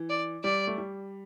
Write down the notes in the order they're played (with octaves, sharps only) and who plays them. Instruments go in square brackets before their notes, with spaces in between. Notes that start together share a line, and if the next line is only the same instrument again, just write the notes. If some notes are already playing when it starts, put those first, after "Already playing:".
Already playing: [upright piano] E3
[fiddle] D5
[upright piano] G3 [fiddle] D5
[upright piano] A3
G3